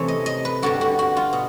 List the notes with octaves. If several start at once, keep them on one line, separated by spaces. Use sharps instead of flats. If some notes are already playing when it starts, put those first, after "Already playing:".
Already playing: C3 E3 A3 C#5
D#5
D#5
B4
G2 D3 G3 F#4
F#4
F#4
F4
B2